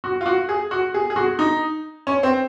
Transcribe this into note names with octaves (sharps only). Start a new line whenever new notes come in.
F#4
F4
F#4
G#4
F#4
G#4
G#4
F#4
D#4
C#4
C4